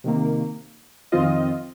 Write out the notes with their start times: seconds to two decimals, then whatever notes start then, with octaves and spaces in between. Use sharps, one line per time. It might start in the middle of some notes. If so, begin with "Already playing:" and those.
0.04 C3 D#3 A#3
1.12 F2 D#3 C4 F4 D#5